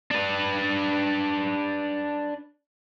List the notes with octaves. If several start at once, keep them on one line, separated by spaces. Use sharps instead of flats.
D4 B4